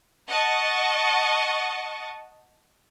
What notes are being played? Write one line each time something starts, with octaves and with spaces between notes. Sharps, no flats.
D#5 F#5 A5 C#6